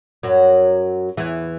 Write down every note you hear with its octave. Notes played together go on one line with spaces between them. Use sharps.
F#2 F#3
E2 E3